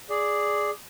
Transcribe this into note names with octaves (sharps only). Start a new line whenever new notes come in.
G#4 D5